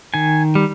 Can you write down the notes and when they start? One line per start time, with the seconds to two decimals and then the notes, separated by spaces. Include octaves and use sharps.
0.14 D#3 G#5
0.55 G3